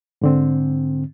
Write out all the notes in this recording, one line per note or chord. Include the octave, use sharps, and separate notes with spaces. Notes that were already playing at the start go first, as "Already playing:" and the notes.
G#2 D3 C4